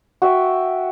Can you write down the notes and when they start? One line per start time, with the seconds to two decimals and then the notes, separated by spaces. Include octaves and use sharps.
0.22 F#4 E5 G5